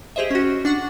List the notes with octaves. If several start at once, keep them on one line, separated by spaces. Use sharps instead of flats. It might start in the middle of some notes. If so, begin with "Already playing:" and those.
G4 G#4 C5 D#5 E5
C#4 F#4
D4 F#5 C#6